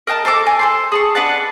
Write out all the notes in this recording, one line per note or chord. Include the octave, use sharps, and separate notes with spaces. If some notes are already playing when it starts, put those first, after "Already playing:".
A#4 D#5 G5 A5
A4 C5 A5 D6
G#5
A4 C5 C6
G#4 A5 C#6
D4 B4 F#5 A5